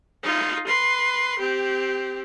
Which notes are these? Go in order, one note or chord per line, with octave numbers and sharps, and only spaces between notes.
D#4 F4
B4 C6
C4 G4